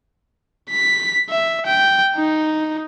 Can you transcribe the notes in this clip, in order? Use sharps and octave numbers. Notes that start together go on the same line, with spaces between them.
B6
E5
G5
D#4